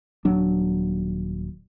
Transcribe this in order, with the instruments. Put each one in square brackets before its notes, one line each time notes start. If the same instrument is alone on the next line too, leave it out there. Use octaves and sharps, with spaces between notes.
[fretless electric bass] D#1 F#3 D4